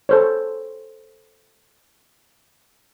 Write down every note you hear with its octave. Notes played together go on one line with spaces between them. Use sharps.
A4 C5 C#5